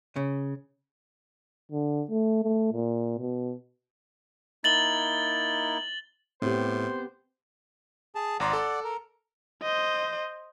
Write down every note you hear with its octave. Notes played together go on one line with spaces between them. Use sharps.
C#3
D3
A3
A3
A#2
B2
A#3 D#4 E4 A6 F#7 G7
A2 B3 C4 G4 C5
G#4 A5
G#1 D5 F#5 A#5 C6
A4
A#4
C5 D#5